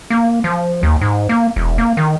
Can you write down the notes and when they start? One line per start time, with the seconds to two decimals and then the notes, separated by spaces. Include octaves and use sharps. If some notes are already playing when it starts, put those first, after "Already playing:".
0.10 A#3
0.44 F3
0.83 D#2
1.01 G#2
1.29 A#3
1.56 E1
1.78 A#3
1.97 D#3